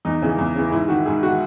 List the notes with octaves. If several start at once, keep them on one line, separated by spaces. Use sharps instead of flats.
E2 D#4
C#3 E3
E2
C#3 E3
G#2 E4
D#3 F#4
G#2 G#4
D#3 F#4